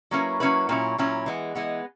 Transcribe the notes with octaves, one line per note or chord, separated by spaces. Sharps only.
F#3 A#3 C#4 E4 B4
F#3 A#3 C#4 E4 B4
A#2 F#3 C#4 E4
A#2 F#3 C#4 E4
E3 G#3 B3
E3 G#3 B3